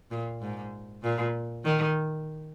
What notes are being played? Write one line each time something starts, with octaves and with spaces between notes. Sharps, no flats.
A#2
G#2
A#2
D#3